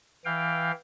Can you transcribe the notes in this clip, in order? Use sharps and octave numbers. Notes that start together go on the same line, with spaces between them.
E3 F5 G5